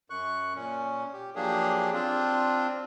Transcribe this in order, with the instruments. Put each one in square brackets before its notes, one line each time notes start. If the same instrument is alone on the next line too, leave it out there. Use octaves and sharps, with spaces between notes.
[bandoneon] F#2 C#6 F#6
A#2 C#4
G4
F3 F#3 A#3 D4 G4 G#4
C4 D4 F4